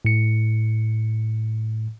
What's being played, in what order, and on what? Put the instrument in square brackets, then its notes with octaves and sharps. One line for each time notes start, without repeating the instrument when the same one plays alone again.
[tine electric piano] A2 C#7